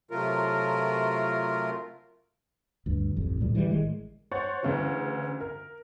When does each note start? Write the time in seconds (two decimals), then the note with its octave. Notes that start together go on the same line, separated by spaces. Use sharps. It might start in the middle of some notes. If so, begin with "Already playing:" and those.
0.11 C3 F#3 A3 F4 A#4
2.86 D2 G2
3.16 A1 F2
3.40 D2 A#2 G3
3.54 D3 E3 F3 G3
3.71 A1 D#3 G#3
4.32 C5 C#5 F#5 A6
4.63 D2 C#3 E3
5.40 A#4